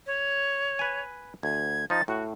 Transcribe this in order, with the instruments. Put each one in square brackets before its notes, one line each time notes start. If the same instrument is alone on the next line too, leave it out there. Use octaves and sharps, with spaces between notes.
[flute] C#5
[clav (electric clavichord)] B4 G#5
[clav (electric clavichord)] D2 [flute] G#6
[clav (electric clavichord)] F3 D#4 [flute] A6
[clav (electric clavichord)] A2 [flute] F#4